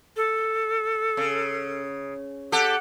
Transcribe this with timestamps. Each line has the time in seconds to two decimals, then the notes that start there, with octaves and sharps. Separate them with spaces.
0.16 A4
1.17 C#3
2.52 G4 A4 F#5